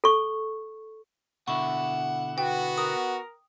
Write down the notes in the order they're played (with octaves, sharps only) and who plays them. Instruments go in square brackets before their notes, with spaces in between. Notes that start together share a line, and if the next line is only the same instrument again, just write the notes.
[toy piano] A4 C#6
[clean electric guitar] B2 D3 E4 [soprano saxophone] F#5 [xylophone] C#6
[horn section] B3 F#4 [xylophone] G5
[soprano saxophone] A#4 [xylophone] D#6